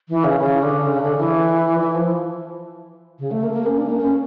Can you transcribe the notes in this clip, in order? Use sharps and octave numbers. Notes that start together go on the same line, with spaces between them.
E3
C#3
C#3
D3
C#3
D3
E3
E3
F3
C#3
A3
A#3
A#3
C#4
D4
A3
A#3
C#4